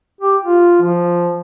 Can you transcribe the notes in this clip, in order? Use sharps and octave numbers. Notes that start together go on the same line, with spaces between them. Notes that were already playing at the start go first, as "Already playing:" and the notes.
G4
F4
F3